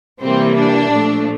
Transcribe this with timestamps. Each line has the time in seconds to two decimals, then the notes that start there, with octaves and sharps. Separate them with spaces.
0.21 C3 E3 G3 A#3 C4
0.56 D4
0.92 A#2 F3 A3